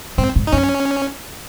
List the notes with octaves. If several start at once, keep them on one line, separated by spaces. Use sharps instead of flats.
G#2 C4
G#2
D#4
F#2 C#4